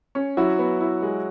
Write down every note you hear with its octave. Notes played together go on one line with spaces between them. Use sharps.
C#4
F#3 E4 F#4
B3
E4
G#3